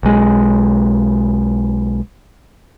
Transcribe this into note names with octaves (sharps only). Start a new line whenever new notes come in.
B1 G#3